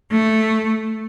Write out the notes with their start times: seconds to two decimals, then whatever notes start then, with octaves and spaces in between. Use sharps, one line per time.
0.10 A3